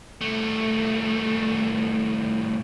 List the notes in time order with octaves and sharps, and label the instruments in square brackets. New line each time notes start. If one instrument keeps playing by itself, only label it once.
[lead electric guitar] C2 A3